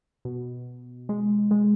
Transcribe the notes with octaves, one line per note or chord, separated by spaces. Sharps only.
B2
G#3
G#3